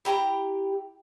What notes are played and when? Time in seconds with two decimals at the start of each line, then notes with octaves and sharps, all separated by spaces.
0.05 E4 G4 A#5